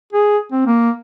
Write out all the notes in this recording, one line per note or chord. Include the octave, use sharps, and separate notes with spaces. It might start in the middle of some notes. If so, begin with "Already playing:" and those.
G#4
C4
A#3